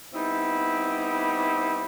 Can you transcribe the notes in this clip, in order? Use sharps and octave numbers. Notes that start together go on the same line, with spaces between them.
G3 B3 C4 D#4 E4